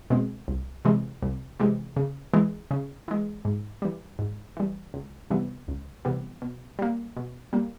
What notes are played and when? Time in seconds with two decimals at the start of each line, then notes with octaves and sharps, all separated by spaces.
0.10 B2 G#3 C4
0.48 C2
0.85 C3 E3 G#3
1.22 C2
1.60 C3 E3 G#3
1.96 C#3
2.34 E3 G#3
2.71 C#3
3.08 E3 G#3
3.45 G#2
3.82 E3 G3
4.19 G#2
4.57 E3 G3
4.94 C#2
5.30 C3 E3 G3 B3
5.68 C#2
6.05 C3 E3 G3 B3
6.42 B2
6.79 G3 A#3
7.16 B2
7.53 G3 A#3